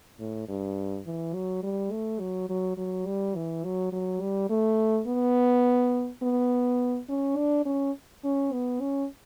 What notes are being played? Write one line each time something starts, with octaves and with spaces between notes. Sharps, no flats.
A2
G2
E3
F#3
G3
A3
F#3
F#3
F#3
G3
E3
F#3
F#3
G3
A3
B3
B3
C#4
D4
C#4
C#4
B3
C#4